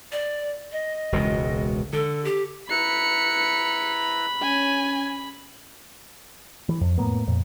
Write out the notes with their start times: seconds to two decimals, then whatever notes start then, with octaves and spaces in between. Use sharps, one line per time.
0.12 D5
0.72 D#5
1.12 E1 C#2 B2
1.93 D3 A4
2.24 G4
2.70 E4 B4 A#5 B5 C#7
4.42 C#4 G#5
6.69 E3
6.81 F2
6.98 A2 A#3 B3
7.27 F2 A#2